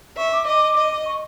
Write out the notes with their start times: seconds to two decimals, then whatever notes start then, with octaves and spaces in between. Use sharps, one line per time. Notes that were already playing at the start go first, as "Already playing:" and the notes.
0.17 E5 C#6
0.32 D6
0.47 D#5 D6
0.76 D#5
1.05 C#6